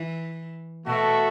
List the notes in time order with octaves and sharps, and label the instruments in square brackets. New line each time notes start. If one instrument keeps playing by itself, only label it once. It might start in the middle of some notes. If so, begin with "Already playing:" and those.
Already playing: [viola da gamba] E3
[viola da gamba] B2 [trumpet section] A3 F#4 A4 E5